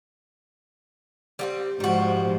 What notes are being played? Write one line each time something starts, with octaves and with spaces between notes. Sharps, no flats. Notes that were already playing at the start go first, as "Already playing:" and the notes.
G3 A#3 C4
G#2 F3 G3 F#4